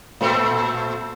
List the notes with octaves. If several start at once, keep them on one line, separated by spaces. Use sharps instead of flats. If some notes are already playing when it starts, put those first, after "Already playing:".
A#2 A3 C4